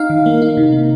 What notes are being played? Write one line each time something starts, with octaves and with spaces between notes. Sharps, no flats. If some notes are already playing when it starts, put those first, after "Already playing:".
Already playing: D#4 F5
D#3
A#3
D#4
C3
A#3